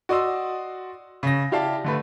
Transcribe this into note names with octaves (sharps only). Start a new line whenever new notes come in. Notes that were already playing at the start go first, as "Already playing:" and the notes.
F#4 D5 D#5 C6 E6
C#3 A#6
E4 G4 D5 F5 A5
D3 A3 B4